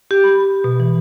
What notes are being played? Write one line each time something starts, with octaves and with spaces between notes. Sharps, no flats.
G4
B5
B2
E3